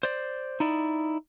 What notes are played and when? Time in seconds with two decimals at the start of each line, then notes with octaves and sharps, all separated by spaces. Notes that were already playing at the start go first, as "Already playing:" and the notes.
0.03 C5 D5
0.60 D#4 E4 D5